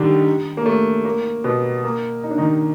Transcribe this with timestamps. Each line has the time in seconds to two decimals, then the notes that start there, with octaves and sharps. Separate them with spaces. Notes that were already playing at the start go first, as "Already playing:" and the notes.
Already playing: D3 D#3 G3 D4 D#4 G4
0.57 A#3
0.66 A3
1.05 A#3
1.44 B2 B3
1.84 A#3
2.23 D#4
2.30 D4
2.38 D#3 D#4